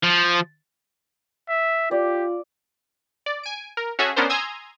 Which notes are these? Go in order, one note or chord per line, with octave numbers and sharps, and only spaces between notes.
F3
E5
F4 G4 D5
D5
G#5 D7
A#4
C#4 F#4 G#4 A4 E5
B3 C#4 D4 A#4 C5
G#5 A#5 C6 D#6 E6 G#6